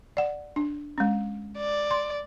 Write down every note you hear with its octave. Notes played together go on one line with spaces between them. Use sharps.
D5 F#5
D4
G#3 C#4
D5
C6